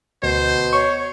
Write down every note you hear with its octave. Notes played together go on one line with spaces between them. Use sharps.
D2 B2 C5
C#5 C#6